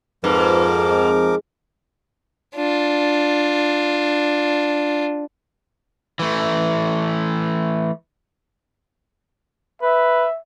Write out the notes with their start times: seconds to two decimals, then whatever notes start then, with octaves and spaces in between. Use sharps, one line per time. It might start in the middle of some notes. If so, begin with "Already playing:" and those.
0.24 F2 G#2 F3 A#4 B4 D6
0.91 G#3
2.55 D4 F4
6.19 E3 A3
9.82 B4 E5